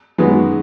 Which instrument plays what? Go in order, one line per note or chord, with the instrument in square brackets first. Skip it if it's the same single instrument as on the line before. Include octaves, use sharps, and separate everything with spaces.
[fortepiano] F#2 D#3 G#3 B3 F#4